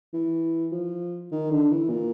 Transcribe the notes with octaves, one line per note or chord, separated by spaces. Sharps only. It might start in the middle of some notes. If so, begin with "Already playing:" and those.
E3
F3
D#3
D3
E3
A#2